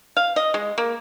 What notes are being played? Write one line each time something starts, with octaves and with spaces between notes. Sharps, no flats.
F5
D#5
G#3
A#3